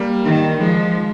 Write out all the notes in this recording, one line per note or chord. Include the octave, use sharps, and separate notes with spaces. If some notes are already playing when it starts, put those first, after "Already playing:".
Already playing: G3 A#3
D#3
F3 G#3